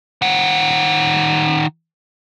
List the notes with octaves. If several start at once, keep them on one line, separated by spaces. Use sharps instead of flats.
D#3 F#5